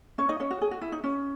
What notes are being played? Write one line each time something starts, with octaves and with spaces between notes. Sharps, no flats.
C#4 C#5
D#4 D#5
C#4 C#5
F#4
G#4
F#4
E4
D#4
C#4